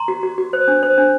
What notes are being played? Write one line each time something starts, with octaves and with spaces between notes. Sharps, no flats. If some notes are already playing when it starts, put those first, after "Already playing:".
Already playing: A#5 C6
F#4
F#4
F#4
C5
D4
C5
D4